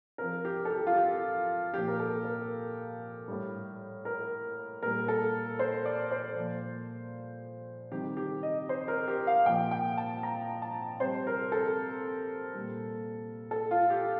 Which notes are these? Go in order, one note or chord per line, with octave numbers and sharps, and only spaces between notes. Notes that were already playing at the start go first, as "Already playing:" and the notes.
C3 F3 A#4
G4
A4
G4
F4
G4
A#2 F3 G4
A#4
A4
A#4
A2 G3
A#4
A#2 G3 A#4
A4
C5
D5
C5
A#2 F3
C3 D#3 G3 G4
G4
D#5
C5
A#4
G4
F5
A#2 F3 G5
G5
A5
A#5
A5
C3 G3 C5
A#4
A4
A#2 G3
A4
F4
G4